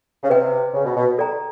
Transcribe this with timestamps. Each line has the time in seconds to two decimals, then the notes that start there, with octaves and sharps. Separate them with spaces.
0.23 C#3
0.30 C3 B4 D#5 G5
0.74 C#3
0.85 B2
0.97 B2
1.18 A4 D5 G5 A#5